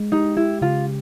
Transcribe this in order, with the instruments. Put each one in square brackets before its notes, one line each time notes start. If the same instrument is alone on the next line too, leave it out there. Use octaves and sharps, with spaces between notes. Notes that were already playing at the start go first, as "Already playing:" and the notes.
Already playing: [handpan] G#3
[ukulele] D#4 [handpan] G4
[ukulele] E4 [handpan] G4
[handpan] C#3 [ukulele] F4